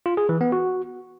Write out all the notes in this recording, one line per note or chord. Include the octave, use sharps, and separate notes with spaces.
F4
G#4
E3
B3
F#4